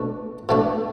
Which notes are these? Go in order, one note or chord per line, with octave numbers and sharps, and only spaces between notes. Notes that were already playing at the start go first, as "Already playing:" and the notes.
Already playing: B2 A3 D4 B4
B2 A3 D4